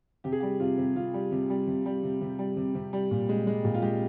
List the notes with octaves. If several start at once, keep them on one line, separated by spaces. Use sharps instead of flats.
C3 G4
G#4
G3 G4
C3 F4
C3
C3 F4
G3
C3
G3
C3
G3
C3
C3
G3
C3
C3
G3
A#2
G#3
G#3
A#2
F4
G#3 G4